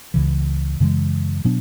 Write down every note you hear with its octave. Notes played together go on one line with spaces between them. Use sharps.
C#2 C#3 E3
F#2 C#3 E3 G#3
B2 F#3 B3 D4